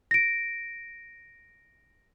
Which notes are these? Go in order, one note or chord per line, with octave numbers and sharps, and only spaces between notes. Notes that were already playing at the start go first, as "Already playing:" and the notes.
A#6 D7